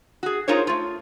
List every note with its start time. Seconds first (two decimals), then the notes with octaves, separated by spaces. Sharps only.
0.23 F#4 G#4
0.48 D#4 F4 G#4 A#4 C5 C#5
0.67 A3 F4